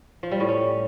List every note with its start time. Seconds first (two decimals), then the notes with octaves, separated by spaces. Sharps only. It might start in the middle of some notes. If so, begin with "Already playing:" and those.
0.23 F3
0.31 G3
0.40 A2
0.49 C#4